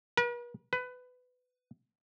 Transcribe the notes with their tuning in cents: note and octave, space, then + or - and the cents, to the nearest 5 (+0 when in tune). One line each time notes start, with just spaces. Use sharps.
B4 -45
B4 +20